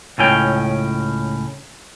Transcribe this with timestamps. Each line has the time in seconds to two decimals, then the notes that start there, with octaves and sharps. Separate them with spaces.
0.18 C#2 A2 C#4 G5